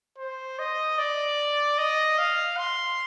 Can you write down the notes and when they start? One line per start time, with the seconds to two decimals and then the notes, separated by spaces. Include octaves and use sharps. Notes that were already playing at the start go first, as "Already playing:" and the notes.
0.18 C5
0.59 D#5
0.98 D5
1.78 D#5
2.18 F5
2.58 C6